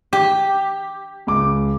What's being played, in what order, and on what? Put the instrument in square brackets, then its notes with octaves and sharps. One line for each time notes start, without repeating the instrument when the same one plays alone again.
[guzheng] G4
[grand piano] C#2 D6